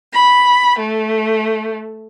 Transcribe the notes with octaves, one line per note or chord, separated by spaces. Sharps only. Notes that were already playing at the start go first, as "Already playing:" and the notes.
B5
A3